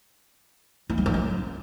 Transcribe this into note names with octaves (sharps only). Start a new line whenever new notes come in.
D#4
G3
D#4
C#4